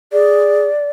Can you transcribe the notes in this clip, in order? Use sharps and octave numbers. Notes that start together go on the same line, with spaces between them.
G#4 D5